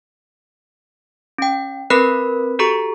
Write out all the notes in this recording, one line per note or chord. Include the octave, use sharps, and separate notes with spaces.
C#4 G5
C4 A#4 B4 B5 F#6 B6
F#4 G4 A4 A#5 C#6